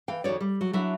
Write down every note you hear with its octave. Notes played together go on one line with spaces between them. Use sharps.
E3 F5 G5
F2 D#3 F#4 C#5 D5
G3
F#3
F#3 D4 E4 E5